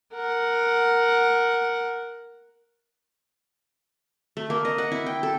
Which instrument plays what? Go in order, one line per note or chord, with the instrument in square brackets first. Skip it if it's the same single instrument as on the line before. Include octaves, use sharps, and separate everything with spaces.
[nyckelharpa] A#4 F#5
[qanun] A3
A#3
D#5
F#5
E4
G5
A4